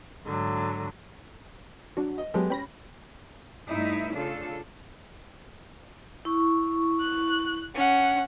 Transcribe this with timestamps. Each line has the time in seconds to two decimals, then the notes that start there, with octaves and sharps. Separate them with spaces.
0.24 G#2 D3 F#3
1.97 F#3 D4 F#4
2.18 D#5
2.34 F#3 G#3 B3 G4 A4
2.50 C#4 G5 B5 A#6
3.72 G2 A3 D#4 E4 E5
4.16 C#3 D4 F4 A4
6.25 E4 C#6
7.01 F#6
7.75 C#4 F#5